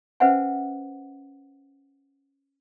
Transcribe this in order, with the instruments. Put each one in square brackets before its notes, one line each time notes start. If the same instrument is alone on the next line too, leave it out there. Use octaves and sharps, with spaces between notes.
[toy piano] C#4 B4 C5 E5 F#5 G#5